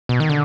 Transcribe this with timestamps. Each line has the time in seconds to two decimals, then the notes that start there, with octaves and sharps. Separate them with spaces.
0.09 B2
0.20 D#3
0.29 D3